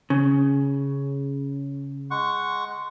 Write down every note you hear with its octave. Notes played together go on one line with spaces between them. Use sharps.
C#3
G#3 F#5 C#6